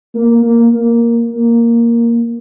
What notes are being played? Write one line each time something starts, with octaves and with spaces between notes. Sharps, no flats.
A#3
A#3
A#3
A#3